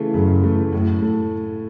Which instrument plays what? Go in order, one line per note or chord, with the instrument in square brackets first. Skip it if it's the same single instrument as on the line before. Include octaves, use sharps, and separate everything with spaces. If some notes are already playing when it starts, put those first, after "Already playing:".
Already playing: [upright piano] C#3 E3 A3
[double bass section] F#2 [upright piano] C#3
[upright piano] E3 A3
[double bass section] F#2 [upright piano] A2
[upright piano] A3